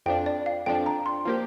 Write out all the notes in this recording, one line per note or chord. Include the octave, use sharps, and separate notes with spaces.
F2 F3 D4 G5
D5
F5
F2 F3 D4 G5
A#5
C6
F3 A#3 G4